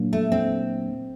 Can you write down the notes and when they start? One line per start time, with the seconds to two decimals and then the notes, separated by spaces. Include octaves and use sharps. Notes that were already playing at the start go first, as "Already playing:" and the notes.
Already playing: A#2 F#3 A#3 D4
0.13 A3
0.32 C4